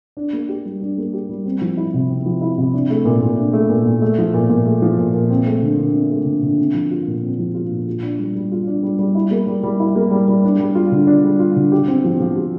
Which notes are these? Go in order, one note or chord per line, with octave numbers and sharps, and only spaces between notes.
D4
A#3
G4
G3
D4
A#3
G4
G3
C4
F3
E4
C3
C4
F3
E4
C3
D4
A3
A#2
A#2
D4
A3
A#2
A#2
A3
F3
A#2
A#2
A3
F3
A#2
A#2
C4
A3
D3
D3
C4
A3
D3
D3
C4
F3
F4
A#2
C4
F3
F4
A#2
F4
D4
G3
G3
F4
D4
G3
G3
E4
A#3
G3
G3
E4
A#3
G3
G3
D4
G3
F4
D3
D4
G3
F4
D3
G4
C4
F3
F3
G4